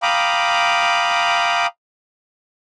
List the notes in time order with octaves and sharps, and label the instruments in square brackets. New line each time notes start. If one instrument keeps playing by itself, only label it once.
[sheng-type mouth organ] F5 G5 A#5 B5 D6 D#6